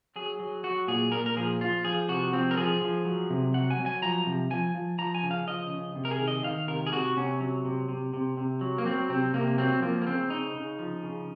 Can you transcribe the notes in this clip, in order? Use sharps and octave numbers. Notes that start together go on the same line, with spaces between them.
F#3 G#4
F#3
F#3 F#4
A#2 G#4
A#2 A#4
A#4
F3 G#4
F3 F4
F3 G#4
C3 F#4
F3 C4
A#4
F3 G#4
F3
F#3
C3
F#3 F#5
G#5
F#3
G#5
F3 A#5
C3
F3 G#5
F3
F3 A#5
G#5
C#3
F5
F3 D#5
C#3
C3
A#4
G#4
D#3
D#5
D#3 F5
C3 A#4
G#4
C3 F#4
C3 C#4
F#3
C3
C3
C3
C3
F#3
A#3
F#3 C4
C3 C4
C3 A#3
F#3 C4
F3 A#3
A#3
C#3 C4
C#3 D#4
C#3
F3
C#3